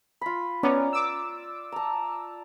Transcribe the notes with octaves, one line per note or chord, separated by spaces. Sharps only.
F4 B5
B3 C#4 D5 A#5
D6 E6
A5 A#5